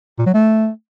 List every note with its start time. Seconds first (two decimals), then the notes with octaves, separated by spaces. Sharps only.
0.19 A#2
0.26 F#3
0.34 A3